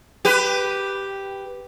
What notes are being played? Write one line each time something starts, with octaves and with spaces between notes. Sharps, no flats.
G4 B4